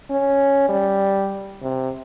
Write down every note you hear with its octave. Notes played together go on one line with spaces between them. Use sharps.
C#4
G3
C3